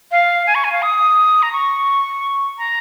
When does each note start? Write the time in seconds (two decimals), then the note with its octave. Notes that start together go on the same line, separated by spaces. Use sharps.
0.11 F5
0.47 G#5
0.55 C#6
0.64 G#5
0.72 F5
0.82 D#6
1.42 A#5
1.52 C#6
2.58 A#5